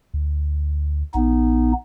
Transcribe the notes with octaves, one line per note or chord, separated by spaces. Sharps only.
D2
A#1 B3 D#4